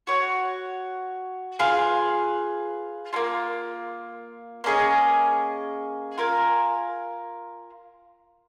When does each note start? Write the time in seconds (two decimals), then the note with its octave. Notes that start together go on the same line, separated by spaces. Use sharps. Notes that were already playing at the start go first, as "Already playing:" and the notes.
0.07 F#4 C#5 F#5
1.59 F4 G#4 B4 F5
3.13 A#3 C#4 F4
4.64 A#3 C#4 G#4 D#5
6.18 F4 A#4 F5 G#5